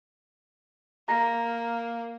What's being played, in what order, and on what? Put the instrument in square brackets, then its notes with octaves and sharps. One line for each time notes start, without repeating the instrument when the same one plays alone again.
[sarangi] A#3 [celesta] A#5 A#6